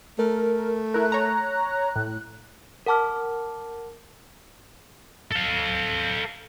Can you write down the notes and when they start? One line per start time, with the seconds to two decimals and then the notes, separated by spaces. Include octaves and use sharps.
0.19 A3 A#4
0.94 E4 A#4 F#6
1.12 C#5 A#5
1.96 A2
2.86 A#4 F#5 A5 D6 F6
5.32 A4 F5